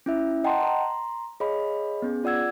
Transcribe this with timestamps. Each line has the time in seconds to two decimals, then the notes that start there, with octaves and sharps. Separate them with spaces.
0.06 C#4 E4 E5
0.44 D#5 F#5 G5 A5 A#5 C6
0.61 A#5 C6
1.40 G#4 C#5 D#5 F5 B5
2.02 B3 C#4 G#4
2.24 F4 D5 F#5 E6 G#6